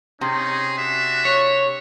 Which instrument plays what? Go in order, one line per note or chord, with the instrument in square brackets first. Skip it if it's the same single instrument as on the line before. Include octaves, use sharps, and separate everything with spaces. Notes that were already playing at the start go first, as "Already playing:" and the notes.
[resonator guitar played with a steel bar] C3 [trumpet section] C#4 D#4 G#4
[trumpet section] D4 F#4 E5
[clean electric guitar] C#5